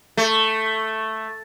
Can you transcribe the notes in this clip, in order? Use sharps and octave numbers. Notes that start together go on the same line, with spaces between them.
A3